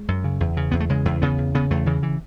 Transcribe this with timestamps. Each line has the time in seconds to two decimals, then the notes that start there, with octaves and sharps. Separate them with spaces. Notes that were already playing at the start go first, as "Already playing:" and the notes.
Already playing: G#3
0.08 F#2
0.24 C#3
0.40 E2
0.57 C#3
0.71 E2 B3
0.80 A3
0.89 C#3 G#3
1.05 E2
1.22 C#3 B3
1.38 E2
1.55 C#3 B3
1.71 E2 A3
1.86 C#3 E3
2.03 E3